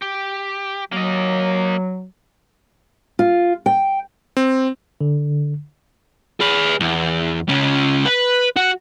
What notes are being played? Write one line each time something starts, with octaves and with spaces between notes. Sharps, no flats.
G4
F#3 A#3 D#5
F4
G5
C4
D3
G#4 B4
E2
C#2 C#4
B4
F#4